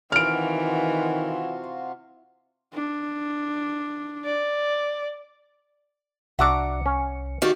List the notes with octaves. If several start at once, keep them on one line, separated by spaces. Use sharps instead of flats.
C3 D#3 E3 F4 F#4 F6 D7
D4
D5
C2 D4 F#4 E5 F#5 A#5 D6 C#7
C#4
D#3 F#4 G4 D5 F5